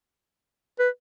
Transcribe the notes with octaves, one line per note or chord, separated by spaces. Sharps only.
B4